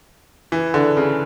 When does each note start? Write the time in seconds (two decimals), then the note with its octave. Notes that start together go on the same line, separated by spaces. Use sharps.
0.52 E3
0.74 D3
0.97 C#3